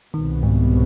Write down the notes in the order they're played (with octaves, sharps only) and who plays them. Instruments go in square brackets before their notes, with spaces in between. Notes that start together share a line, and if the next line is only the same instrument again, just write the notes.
[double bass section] C2 B2 B3 [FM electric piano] D#3
[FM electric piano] G#2